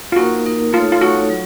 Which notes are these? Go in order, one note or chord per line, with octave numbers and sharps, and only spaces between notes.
F4
A#3 D#4 F#4 A#4
A#3 D#4 A#4
A3 D#4 F4 A4 C#5
F4
A3 D#4 F#4 A4 C#5
F#3